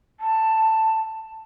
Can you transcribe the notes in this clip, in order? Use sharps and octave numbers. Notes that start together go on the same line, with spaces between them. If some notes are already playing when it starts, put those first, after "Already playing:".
A5